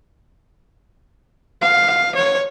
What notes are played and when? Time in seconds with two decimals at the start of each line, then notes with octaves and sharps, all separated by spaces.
1.61 F5
2.16 C#5